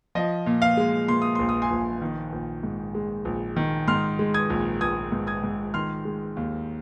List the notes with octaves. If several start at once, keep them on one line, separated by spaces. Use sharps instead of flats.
F3 D#5
A#2
F5
G#3
A#2 C6
D#6
A#1 C6
D#6
G#5 C6
A#1
D#3
A#1
G#2
G#3
A#1
D#3
G#2 C6 F6
G#3
D#6 G#6
A#1
A#1 D#6 G#6
G#2
D#6 G#6
G#2
D#3 C6 F6
G#3
D#2